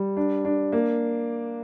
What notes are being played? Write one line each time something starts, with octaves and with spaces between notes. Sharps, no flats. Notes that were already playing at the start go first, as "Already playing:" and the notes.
Already playing: G3
D4
D4
A#3